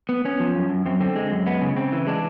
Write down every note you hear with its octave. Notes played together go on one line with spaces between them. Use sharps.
B3
B3 C#4
F3
F#2
F#2
F#2 C4
D3 C4
G#3
F#2
G#3 B3
C#3
C#3 C4
E3
G#3 D4